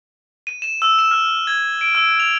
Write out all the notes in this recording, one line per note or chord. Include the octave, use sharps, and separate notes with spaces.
D#7
E7
E6
E7
F6
G#6
D7
E6
F7